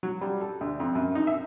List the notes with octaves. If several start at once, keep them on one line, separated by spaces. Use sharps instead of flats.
F#3
G3
A4
D2
F2
F#2
D#4
E5